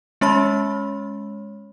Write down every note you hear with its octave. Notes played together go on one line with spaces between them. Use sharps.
G#3 C#4 C#5 B5